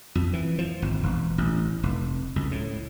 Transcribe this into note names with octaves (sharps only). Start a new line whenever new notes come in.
F2
E3
F3
G#1
E1
A1
F1
C#2
A2